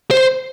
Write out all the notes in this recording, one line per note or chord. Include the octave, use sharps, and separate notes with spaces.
C5